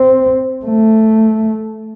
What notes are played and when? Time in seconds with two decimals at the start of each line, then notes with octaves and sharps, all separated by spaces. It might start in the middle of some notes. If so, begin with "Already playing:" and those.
Already playing: C4
0.65 A3